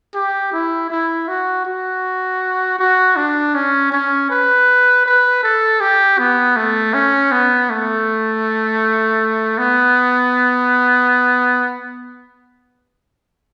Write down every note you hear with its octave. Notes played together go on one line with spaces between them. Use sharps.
G4
E4
E4
F#4
F#4
F#4
D4
C#4
C#4
B4
B4
A4
G4
B3
A3
C#4
B3
A3
B3